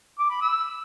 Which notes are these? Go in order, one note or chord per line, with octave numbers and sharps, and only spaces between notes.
D6
B5
E6